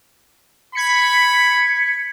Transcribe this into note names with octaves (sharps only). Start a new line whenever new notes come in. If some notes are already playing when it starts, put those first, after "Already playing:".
B5 G#6 B6 C#7